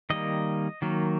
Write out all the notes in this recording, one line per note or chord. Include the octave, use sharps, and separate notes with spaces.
D#3 G3 A#3 D#5
D#3 F#3 A#3